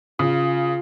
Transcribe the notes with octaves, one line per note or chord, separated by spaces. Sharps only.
C#3 F4